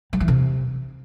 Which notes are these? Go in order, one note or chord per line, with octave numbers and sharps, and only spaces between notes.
G3
E3
C3